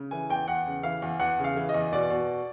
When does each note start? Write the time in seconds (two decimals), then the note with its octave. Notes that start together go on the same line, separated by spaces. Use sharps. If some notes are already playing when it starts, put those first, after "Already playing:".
Already playing: C#3
0.11 E3 G#5
0.30 E2 G5
0.48 E2 F#5
0.66 C#3
0.83 E3 F5
1.02 E2
1.20 E2 F#5
1.39 C#3
1.44 F5
1.56 E3
1.69 D#5
1.74 E2
1.93 B2 D5
2.10 B2